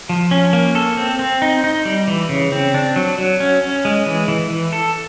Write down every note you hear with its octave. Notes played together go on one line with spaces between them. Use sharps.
F3
C#4
A#3
A4
C4
C4
D#4
D#4
G3
E3
C#3
C4
D4
F#3
F#3
C#4
C#4
G#3
E3
E3
E3
A4